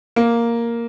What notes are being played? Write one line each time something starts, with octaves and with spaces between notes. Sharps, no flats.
A#3